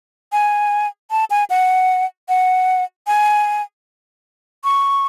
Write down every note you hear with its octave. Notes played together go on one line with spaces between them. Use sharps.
G#5
A5
G#5
F#5
F#5
G#5
C#6